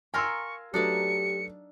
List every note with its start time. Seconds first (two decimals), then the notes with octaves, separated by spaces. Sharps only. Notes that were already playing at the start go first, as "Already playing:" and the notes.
0.14 F4 A#4 G5 G#5 C6 C#6 E6
0.74 F#3 A3 D4 D#4 G4 B4 D5 C#7